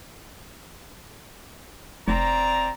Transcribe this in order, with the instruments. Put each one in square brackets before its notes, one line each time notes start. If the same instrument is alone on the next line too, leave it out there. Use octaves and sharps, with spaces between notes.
[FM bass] F1 [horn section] C4 D5 A#5